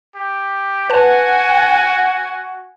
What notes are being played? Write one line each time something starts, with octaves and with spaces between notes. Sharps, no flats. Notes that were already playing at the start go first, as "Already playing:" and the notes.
G4
F#4 B4 F#5 G#5 A5